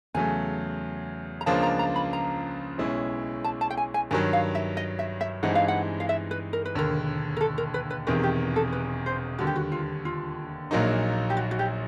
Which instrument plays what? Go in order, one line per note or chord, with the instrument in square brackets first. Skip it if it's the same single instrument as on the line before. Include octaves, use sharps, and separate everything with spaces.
[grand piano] E2 C#3 F#3 A3 [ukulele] G#5
[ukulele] A#5
[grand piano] C#2 C#3 F3 A#3 D4 [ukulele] A5
[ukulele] A#5
A#5
B5
A#5
[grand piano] B1 B2 G#3 C#4 E4
[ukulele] A5
A5
G5
G#5
G#5
[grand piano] G2 D#3 F#3 [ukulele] G#5
[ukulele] F5
E5
D#5
E5
E5
[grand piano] G2 E3 G#3 C4 D#4 [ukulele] F#5
[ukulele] F5
F#5
F5
E5
B4
A#4
B4
[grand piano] E1 D#2 D3 [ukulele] A#4
[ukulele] A#4
A4
A#4
B4
B4
[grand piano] E1 E2 C3 D#3 [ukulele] B4
[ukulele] G4
A4
B4
C5
[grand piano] D#2 D3 G3 [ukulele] F#4
[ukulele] G4
F#4
F4
F4
[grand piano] A#1 A#2 F#3 A#3 D#4
[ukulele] G4
F#4
F#4
G4